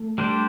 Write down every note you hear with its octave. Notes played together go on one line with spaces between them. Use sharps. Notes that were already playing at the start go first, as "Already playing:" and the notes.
Already playing: A3
G3 D4 G4 C5